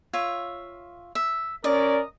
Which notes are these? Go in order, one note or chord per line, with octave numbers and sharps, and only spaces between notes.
F4 C#5 E5
E5
C#4 A#4 D5 D#5